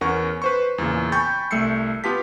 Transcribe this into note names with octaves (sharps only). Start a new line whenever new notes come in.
E2 C#4 A#4 F#5 C#6
B4 C5 C#6
E2 A#2 C#3
G5 G#5 B5 C#6 G6 A6
C2 A3 E6 C7 C#7
B3 F4 G4 A5 B6